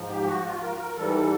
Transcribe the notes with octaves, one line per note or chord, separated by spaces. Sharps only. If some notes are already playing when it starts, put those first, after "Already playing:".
Already playing: G#2 F3
G4
F#4
F4
A#4
A#4
G#2 E3 G3 A4